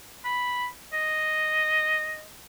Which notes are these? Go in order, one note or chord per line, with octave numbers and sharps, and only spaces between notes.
B5
D#5